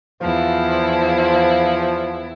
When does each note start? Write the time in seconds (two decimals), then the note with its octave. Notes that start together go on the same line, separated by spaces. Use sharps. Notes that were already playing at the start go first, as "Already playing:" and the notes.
0.21 E2 F3 E4